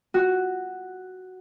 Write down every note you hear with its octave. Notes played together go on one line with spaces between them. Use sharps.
F#4